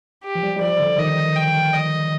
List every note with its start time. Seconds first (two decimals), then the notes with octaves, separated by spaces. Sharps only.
0.24 G4
0.35 F3
0.43 G3
0.57 G3
0.61 F3 D5
0.80 D3
0.98 D#3 D#5
1.36 G5
1.73 D#5